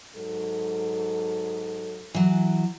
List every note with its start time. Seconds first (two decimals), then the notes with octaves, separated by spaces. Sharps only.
0.16 G#2 F#3 A4
2.15 E3 F#3